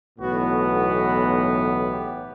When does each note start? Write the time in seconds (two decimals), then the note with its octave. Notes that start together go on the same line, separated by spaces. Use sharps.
0.18 B1 A2 E3 B3 F#4
0.47 F#4
1.90 G4